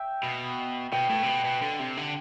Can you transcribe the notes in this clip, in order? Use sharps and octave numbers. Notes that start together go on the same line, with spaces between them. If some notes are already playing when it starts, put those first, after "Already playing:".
Already playing: E5 G5
B2
B2 G5
A2
C3
B2
B2
D3
C3
D3